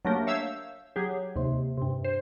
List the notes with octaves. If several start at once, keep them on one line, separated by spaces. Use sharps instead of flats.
F#3 A3 A#3 D4 G4 A#4
C#5 E5 F5 E6 G6
F#3 G4 G#4
D#2 C3
G2 C3
C5